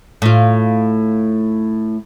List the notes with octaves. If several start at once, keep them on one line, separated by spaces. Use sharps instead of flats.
A2 F4